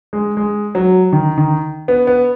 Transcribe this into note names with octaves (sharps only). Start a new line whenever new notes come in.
G#3
G#3
F#3
D#3
D#3
B3
B3